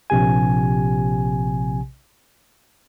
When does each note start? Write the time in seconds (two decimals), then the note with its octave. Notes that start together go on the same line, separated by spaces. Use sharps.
0.10 A#1 C3 G4 G#5